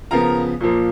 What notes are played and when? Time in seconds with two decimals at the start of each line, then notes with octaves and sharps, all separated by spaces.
0.11 C#3 F3 B3 A#4 A#5
0.61 A#2 F3 A#3